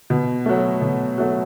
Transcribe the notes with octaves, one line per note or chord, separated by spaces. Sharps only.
B2
F#3 A3
B2
F#3 A3